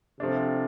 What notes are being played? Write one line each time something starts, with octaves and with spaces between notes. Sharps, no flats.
C3 F3 A3 D4